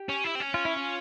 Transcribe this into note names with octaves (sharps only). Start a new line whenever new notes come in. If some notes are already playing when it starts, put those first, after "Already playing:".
Already playing: G4
C#4
E4
C4
C#4
F4
E4
F4